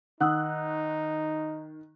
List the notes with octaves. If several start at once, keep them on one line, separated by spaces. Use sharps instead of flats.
D#3 D#4 F#5 D#6 E6 F#6